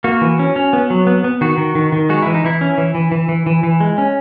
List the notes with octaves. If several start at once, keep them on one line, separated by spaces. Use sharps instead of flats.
A#3 F#4
E3
C#4
C#4
B3
F#3
B3
B3
D#3 F#4
D#3
D#3
D#3
G#3 F#4
E3 E4
D#4
E3 E4
C#4
E3
E3
E3
E3
E3
E3
G#3
C#4